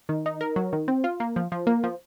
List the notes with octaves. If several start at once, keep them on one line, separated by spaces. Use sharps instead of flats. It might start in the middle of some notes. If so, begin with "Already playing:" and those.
D#3
D#4
A#4
F#3
D#3
C4
F4
A#3
F3
F3
A#3
F3